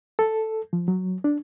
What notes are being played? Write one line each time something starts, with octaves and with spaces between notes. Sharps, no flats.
A4
F3
F#3
D4